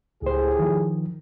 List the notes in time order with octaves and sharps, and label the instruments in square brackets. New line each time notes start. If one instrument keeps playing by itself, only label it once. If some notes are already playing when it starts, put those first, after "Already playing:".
[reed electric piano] C#2 C5 [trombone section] A2 G4 G#4
[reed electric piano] D#3 F3